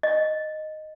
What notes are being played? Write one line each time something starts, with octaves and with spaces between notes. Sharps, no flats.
D#5